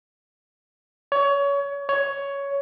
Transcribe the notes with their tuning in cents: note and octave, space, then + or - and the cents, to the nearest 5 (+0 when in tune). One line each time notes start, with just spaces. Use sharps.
C#5 +25
C#5 +10